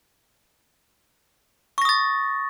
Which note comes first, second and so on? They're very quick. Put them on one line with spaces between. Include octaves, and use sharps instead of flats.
C#6 A#6 D#6 A6